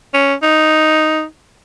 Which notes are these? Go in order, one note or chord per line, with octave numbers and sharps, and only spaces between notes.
C#4
D#4